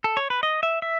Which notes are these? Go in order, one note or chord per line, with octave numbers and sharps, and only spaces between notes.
A4
C#5
B4
D#5
E5
E5